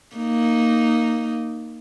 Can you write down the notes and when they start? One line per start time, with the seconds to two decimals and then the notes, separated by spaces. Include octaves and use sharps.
0.16 A#3 D#4